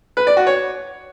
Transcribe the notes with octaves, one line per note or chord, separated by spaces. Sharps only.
B4
D5
F#4
C#5